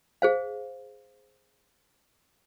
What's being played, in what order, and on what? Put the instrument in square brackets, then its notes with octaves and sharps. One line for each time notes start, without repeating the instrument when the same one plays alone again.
[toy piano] G#4 C5 F5